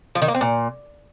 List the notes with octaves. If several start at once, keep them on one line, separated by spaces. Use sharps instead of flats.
F3
D#3
A#3
C4
A#2